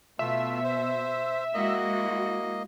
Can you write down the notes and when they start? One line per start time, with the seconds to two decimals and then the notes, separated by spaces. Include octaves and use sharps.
0.19 B2 A3 F4 E5
0.64 C5
1.54 G#3 A#3 E4 F#4 D#5